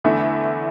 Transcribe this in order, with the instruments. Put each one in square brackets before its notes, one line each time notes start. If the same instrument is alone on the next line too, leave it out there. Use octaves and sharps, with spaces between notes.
[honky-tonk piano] E2 D3 A3 E4